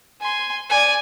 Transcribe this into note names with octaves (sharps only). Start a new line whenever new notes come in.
G#5 C6
D5 G#5